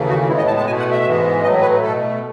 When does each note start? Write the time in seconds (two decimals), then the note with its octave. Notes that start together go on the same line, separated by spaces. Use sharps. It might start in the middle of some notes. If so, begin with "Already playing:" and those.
Already playing: D#2 C#3 E3 A3
0.09 F#4
0.28 A2 G#3 B3 E4
0.37 D#5
0.47 A5
0.57 A5
0.66 B2 G#5
0.70 A3
0.79 F#5
0.92 E5
1.04 G#2 E3 G#3 B3
1.42 A2 F#3 A3 D#5
1.61 B4
1.81 B2 A3 A4